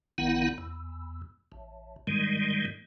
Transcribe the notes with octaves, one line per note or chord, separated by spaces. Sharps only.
A#1 D#3 B3 E4 F#5
E2
A1
G#2 D#3 G3 G#3